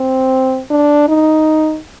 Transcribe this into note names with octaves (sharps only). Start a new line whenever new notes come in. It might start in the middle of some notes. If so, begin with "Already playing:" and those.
Already playing: C4
D4
D#4